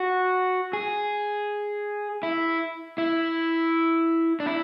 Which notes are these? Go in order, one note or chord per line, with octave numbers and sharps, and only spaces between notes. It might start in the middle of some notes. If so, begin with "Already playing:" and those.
Already playing: F#4
G#4
E4
E4
D4
E4